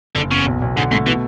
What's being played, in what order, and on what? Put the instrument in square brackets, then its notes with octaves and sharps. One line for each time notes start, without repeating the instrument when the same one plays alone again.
[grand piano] F#1 [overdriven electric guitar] D3
[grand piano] E2 [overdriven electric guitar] C#3
[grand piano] B1
B1
[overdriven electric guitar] G#2 [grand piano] D3
[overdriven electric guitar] G#2 [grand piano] A3
[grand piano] B2 [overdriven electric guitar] E3